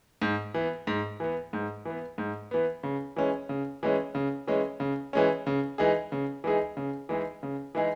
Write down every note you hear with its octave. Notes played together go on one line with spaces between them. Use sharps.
G#2
E3 B3
G#2
E3 B3
G#2
E3 B3
G#2
E3 B3
C#3
E3 G#3 C#4
C#3
E3 G#3 C#4
C#3
E3 G#3 C#4
C#3
E3 G#3 C#4
C#3
E3 G#3 D#4 G#4
C#3
E3 G#3 D#4 G#4
C#3
E3 G#3 D#4 G#4
C#3
E3 G#3 D#4 G#4